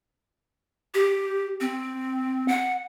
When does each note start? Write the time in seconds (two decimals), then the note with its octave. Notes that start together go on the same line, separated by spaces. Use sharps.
0.94 G4
1.61 C4
2.48 F#5